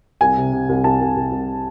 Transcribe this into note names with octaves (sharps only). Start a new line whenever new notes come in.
C2 G#5
C3
C3
C2
C2 A5
C2
C2
C2